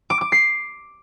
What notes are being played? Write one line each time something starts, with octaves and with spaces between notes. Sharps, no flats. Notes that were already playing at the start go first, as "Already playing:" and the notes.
D6
D6
C7